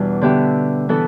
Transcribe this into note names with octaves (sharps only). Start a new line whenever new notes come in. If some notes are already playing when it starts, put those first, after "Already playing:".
Already playing: E2 B2 G3 D4
D3 B3 G4 E5
E3 B3 E4 A4